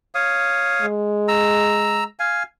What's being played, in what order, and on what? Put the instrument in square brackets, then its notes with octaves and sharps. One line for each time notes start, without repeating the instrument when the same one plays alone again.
[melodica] C#5 F5 D#6
[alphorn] G#3
[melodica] A#5 E6
F5 G#5